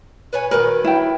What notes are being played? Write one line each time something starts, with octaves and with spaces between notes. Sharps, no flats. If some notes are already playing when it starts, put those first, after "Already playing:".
B4 C#5 G#5
D#3 F#3 A#4 B4
E4 G5